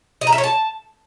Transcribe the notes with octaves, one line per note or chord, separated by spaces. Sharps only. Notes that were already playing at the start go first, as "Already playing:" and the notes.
D#5
A#5
E5
C#5
A5